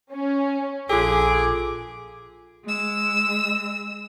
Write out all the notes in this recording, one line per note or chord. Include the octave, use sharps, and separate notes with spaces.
C#4
A#1 F4 G#4 A4 D6
G#3 E6